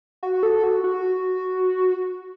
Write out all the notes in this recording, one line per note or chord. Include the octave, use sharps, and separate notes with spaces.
F#4
A4
F#4
F#4